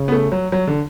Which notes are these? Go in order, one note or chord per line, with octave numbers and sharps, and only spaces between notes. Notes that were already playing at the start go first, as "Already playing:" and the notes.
Already playing: C#3
B3
A3
F#3
F#3
D3